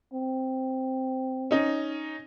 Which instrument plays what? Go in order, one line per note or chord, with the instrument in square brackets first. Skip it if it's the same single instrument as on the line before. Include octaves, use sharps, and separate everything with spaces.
[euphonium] C4
[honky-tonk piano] C#4 D#4